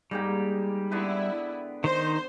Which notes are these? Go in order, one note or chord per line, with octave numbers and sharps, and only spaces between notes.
G#2 G3 A#3 G5
D3 B3 E4 B4
D#3 D#4 C5